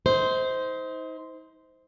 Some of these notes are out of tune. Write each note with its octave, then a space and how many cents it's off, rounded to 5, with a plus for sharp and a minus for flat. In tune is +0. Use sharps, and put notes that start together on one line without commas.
D#4 +40 C5 -10